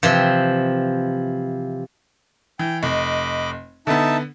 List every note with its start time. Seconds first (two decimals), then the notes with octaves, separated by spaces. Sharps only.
0.03 C3 E3 F3
2.59 E3 G5
2.83 F1 D#5 B5 D6
3.87 D3 B3 D#4 E5 A5